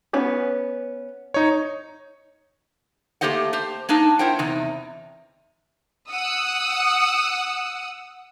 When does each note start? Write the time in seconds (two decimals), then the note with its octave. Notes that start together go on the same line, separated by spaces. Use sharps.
0.13 B3 C#4 B4
1.34 D#4 C#5
3.21 A3 A#3 G4 C5 D#5 F#5
3.53 G4 C5
3.89 A#3 D4 D#4 A5
4.19 E4 A#4 C5 F#5 G5
4.39 E2 C3 D#4
6.09 F#5 D#6 E6